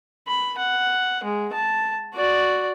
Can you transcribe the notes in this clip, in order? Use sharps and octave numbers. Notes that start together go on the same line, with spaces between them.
B5
F#5
G#3
A5
F#4 D5